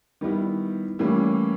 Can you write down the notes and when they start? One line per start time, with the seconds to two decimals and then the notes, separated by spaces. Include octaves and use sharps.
0.21 D#3 G3 B3 E4
0.99 A2 E3 G3 A#3 C#4